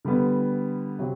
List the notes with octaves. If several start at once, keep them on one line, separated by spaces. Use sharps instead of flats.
D3 G3 B3
C3 F#3